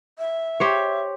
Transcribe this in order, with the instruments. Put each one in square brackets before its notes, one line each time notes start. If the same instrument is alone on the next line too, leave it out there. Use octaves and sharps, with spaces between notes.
[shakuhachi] E5
[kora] G4 C5 C#5